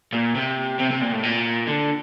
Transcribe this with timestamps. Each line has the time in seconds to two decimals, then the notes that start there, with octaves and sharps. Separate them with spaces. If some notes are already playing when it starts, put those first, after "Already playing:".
0.13 A#2
0.35 C3
0.79 C3
0.90 C3
1.01 A#2
1.12 A2
1.23 A#2
1.67 D3